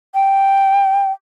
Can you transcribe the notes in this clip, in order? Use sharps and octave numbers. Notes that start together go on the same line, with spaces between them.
G5